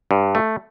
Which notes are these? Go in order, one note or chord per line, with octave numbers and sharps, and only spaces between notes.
G2
A3